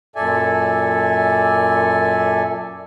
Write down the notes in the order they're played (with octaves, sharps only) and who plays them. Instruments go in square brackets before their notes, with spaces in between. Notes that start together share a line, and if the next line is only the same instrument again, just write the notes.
[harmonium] F#2 A#2 A4 D5 E5 G#5